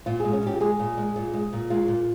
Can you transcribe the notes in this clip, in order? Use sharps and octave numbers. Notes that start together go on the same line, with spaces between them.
A#2 F4
G#4
G#3
C#4
A#2 G4
G#3 G#4
A#2
G#3
A#2
G#3
A#2
G#3 F4
A#2